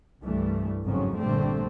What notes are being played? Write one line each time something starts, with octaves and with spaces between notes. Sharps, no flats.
C2 G2 E3 G3 A3
G#1 F2 G#2 C#3 F#3 C#4
A#1 G2 D3 G3 A3 C4